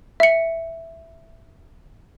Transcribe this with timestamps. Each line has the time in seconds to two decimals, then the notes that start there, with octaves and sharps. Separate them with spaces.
0.20 E5 C#7